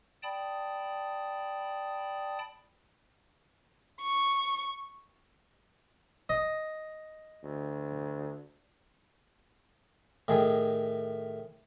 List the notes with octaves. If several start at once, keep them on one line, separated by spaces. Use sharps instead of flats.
D5 G5 A5 B5 D#6
C#6
D#5
D2
A2 D#3 G#4